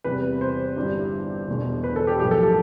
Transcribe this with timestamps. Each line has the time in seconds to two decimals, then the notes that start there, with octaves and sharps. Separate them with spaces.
0.04 E2 C3 G3 B4
0.41 C5
0.76 G1 G2 E3 G3
1.48 E1 E2 B2
1.84 B4
1.96 A4
2.07 G4
2.20 B1 A2 F3 G4
2.31 A4
2.43 A4